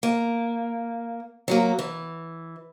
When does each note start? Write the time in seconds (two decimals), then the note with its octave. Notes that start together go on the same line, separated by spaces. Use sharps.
0.03 A#3
1.48 F#3 G3 A#3
1.79 E3